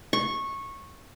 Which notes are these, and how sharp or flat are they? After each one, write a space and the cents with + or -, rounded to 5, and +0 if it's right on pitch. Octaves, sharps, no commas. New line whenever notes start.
C#6 -15